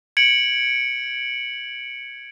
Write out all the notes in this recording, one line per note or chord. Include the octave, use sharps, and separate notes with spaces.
G#6 C#7 D7 F#7